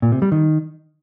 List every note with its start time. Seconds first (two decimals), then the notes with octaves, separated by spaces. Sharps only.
0.02 A#2
0.12 C3
0.22 G3
0.32 D#3